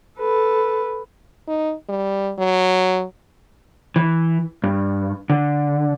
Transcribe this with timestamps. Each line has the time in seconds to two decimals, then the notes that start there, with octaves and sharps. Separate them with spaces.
0.20 A4 B4
1.48 D#4
1.88 G3
2.38 F#3
3.96 E3
4.64 G2
5.30 D3